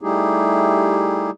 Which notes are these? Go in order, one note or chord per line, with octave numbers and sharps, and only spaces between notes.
G3 A3 D#4 E4 G4 G#4